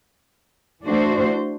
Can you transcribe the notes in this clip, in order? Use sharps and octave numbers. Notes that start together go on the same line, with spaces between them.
E3 A3 D4 F#4 C5